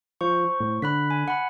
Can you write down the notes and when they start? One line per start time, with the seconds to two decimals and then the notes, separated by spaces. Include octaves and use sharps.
0.21 F3 C5 C#6
0.60 A2
0.82 D3 B5 F#6 B6
1.10 G#5
1.28 F#5 B5